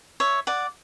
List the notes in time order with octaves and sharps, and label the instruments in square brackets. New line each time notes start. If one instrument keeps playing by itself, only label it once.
[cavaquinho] C#5 E5
D5 F#5